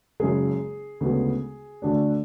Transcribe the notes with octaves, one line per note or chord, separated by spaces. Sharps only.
F#1 F#2 C#3 G#3 G#4
D2 C#3 G#3 B3
D2 D3 A3 D4